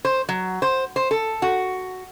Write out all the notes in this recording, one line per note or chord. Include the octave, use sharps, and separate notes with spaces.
C5
F#3
C5
C5
A4
F#4